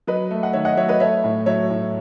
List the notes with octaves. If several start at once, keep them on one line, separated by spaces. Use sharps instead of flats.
F#3 B4 D#5
A3
F#5
D#3 C#5 E5
D#5 F#5
F#3 C#5 E5
B4 D#5
A3 C#5 E5
A2
F#3 C#5 E5
A2